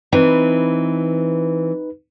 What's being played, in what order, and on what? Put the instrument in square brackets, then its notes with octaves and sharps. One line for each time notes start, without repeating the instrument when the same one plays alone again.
[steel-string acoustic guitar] E3 C4 [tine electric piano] D#4 B4